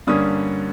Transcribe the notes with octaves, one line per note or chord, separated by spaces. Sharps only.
G2 D3 G3 A#3 C#4 D#6